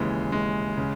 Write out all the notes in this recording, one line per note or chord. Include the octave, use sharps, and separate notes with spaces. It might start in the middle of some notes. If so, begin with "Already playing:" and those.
Already playing: D#2 C#3 E3 G#3
G#3
C#3